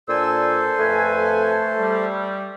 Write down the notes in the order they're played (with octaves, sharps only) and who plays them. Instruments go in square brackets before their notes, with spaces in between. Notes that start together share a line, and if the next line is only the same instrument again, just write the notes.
[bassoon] A#2 [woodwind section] D4 G#5 E6 [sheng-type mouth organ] A4 C5
[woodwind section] F2 B4 G#5 [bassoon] A3
[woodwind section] G3